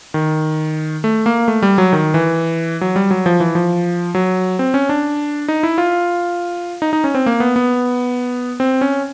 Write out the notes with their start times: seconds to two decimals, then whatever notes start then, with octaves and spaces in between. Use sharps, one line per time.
0.14 D#3
1.04 A3
1.26 A#3
1.48 A3
1.62 G3
1.78 F#3
1.93 D#3
2.14 E3
2.81 F#3
2.96 G3
3.11 F#3
3.26 F3
3.40 E3
3.55 F3
4.15 F#3
4.59 C4
4.74 C#4
4.89 D4
5.48 D#4
5.63 E4
5.78 F4
6.82 D#4
6.93 D#4
7.04 C#4
7.14 C4
7.26 A#3
7.40 B3
7.56 B3
8.60 C4
8.81 C#4